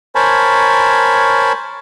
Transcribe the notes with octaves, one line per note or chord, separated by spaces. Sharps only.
A#4 C5 C#5 G#5 A5 B5